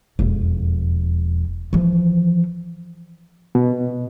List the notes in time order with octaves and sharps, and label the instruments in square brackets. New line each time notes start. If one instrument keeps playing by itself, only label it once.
[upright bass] E1 F2
E3 F3
[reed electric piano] B2